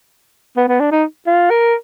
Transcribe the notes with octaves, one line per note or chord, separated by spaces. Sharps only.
B3
B3
D4
D#4
F4
A#4